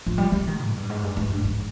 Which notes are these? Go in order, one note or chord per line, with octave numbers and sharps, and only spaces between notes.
F3
G3
G3
D#3
G#2
G2
G#2
G2
G#2
G2
G#2